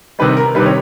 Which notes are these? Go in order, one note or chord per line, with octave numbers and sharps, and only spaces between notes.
C3 D#3 G3 B4
A#4
C3 D#3 G3 B4
C#5